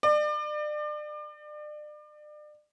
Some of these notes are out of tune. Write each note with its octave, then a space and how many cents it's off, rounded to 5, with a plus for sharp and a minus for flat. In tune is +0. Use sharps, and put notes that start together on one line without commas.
D5 +35